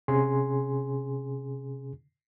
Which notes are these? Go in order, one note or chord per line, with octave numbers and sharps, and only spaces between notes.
C3 C#4 G#4 G#5 C6